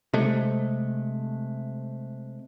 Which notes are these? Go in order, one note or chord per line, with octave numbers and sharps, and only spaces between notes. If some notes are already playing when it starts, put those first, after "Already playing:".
C3 G#3 A3